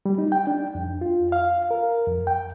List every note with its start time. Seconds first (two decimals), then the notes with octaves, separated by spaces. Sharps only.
0.06 G3
0.18 D#4
0.32 G5
0.47 D4
0.75 F2
1.01 F4
1.32 F5
1.71 A#4
2.07 F2
2.27 G5